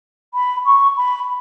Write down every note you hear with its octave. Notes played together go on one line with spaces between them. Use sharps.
B5
C#6
B5